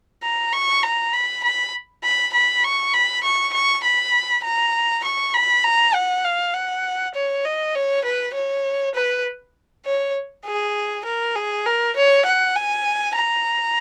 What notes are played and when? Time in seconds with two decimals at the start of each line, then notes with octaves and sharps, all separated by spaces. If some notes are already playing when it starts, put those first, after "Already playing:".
0.23 A#5
0.53 C#6
0.83 A#5
1.13 B5
1.44 B5
2.04 B5
2.33 B5
2.64 C#6
2.94 B5
3.23 C#6
3.53 C#6
3.84 B5
4.44 A#5
5.04 C#6
5.34 B5
5.64 A#5
5.94 F#5
6.25 F5
6.54 F#5
7.15 C#5
7.45 D#5
7.75 C#5
8.05 B4
8.34 C#5
8.95 B4
9.86 C#5
10.45 G#4
11.05 A#4
11.35 G#4
11.66 A#4
11.96 C#5
12.25 F#5
12.56 G#5
13.16 A#5